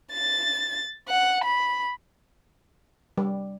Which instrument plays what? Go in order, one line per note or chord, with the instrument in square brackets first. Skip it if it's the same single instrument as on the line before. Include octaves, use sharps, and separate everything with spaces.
[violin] A6
F#5
B5
[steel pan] G3